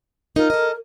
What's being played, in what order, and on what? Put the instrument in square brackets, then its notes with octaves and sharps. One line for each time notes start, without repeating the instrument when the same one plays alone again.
[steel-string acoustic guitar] D#4 F4 [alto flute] A#4
[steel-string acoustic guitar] A4 D#5